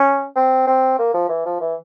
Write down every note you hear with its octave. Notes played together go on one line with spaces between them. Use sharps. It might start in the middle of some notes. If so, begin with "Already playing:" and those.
Already playing: C#4
C4
C4
A#3
F3
E3
F3
E3